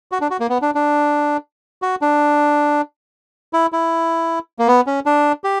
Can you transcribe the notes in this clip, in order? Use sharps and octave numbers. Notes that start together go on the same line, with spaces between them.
F#4
D4
F#4
A#3
B3
D4
D4
F#4
D4
E4
E4
A#3
B3
C#4
D4
G4